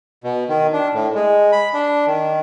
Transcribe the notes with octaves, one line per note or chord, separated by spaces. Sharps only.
B2
D#3
D4
A2
G#3
B5
D4
D#3